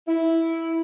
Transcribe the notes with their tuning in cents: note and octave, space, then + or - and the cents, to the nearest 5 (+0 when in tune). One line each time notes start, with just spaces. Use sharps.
E4 -5